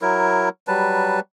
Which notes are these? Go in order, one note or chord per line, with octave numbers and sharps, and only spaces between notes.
F#3 E4 A#4
F#3 G3 B4 A5